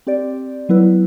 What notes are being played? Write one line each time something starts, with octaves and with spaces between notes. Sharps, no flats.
C4 G4 D5
F#3 B3 E4 B4